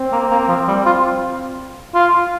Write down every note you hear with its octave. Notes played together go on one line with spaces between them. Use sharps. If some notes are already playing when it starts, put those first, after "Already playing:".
Already playing: C4
A#3
A#3
F3
G3
F4
F4